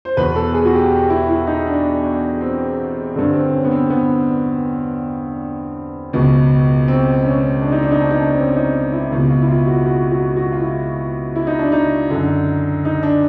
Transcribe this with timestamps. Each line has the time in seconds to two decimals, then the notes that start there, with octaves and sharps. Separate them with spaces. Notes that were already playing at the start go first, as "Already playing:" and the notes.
0.05 C5
0.17 E2 B2 B4
0.36 A4
0.54 G#4
0.65 F#4
0.74 G4
0.92 G4
1.10 E4
1.29 E4
1.47 D#4
1.66 D4
2.41 C4
3.15 G2 D3 C4
3.33 C4
3.53 C#4
3.64 B3
3.71 C4
3.90 B3
6.13 C#2 B2
6.88 C4
7.25 C#4
7.62 D4
7.72 D#4
7.82 D4
7.92 D#4
8.01 D4
8.11 D#4
8.20 D4
8.33 C4
8.37 C#4
8.56 D#4
8.92 E4
9.12 C#2 B2 F4
9.30 F4
9.41 E4
9.49 F4
9.67 F#4
9.86 F#4
10.11 F#4
10.36 F#4
10.52 F4
10.61 E4
11.36 E4
11.47 D#4
11.59 D4
11.72 D#4
12.10 F#2 D3
12.85 D#4
13.03 D4